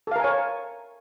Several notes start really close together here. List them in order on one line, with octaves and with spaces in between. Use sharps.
A4 F5 A#4 G#5 C#5